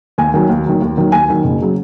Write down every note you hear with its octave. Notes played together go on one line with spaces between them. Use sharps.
D#2 G#5
D#3 F#3
D#2
D#3 F#3
D#2
D#3 F#3
D#2 G#5
D#3 F#3
F#1
C#3 F#3